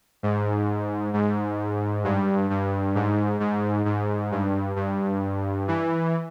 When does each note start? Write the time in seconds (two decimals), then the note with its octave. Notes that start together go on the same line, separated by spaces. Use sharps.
0.23 G#2
1.14 G#2
2.04 G2
2.50 G2
2.95 G#2
3.40 G#2
3.85 G#2
4.32 G2
4.76 G2
5.68 E3